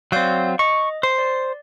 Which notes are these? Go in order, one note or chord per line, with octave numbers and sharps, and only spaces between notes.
F#3 C4 D5 F5 G6
D#5 C#6
C5 C7
D5